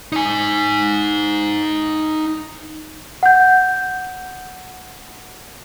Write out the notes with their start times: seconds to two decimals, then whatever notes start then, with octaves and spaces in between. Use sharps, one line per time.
0.12 D#4 G#5
3.23 F#5 G6